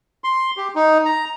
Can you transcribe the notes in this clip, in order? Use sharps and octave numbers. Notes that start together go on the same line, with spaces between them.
C6
G4
D#4
A#5